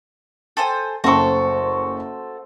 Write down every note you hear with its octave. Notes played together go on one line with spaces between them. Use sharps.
A4 C5 G#5
F#1 A3 F#4 A4 C5 C#6